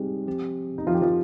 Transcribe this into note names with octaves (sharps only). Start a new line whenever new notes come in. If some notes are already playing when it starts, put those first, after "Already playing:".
Already playing: G3 G#3 C4 D#4 G4
F3 C4 G4
D#4
F3 F4
G4
F3 F4